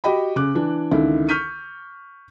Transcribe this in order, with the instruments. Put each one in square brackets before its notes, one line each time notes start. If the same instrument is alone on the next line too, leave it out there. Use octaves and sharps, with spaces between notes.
[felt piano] F#4 G4 D#5 G5 B5
C#3 D6 F#6
E3 D4
C#2 D3 D#3 E4
C#6 F6 G6 B6 D#7